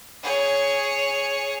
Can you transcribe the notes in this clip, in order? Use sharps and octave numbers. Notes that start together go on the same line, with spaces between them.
G#4 C#5